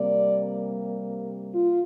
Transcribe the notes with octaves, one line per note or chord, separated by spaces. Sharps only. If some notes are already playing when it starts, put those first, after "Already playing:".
Already playing: C3 G3 A#3 D5
F4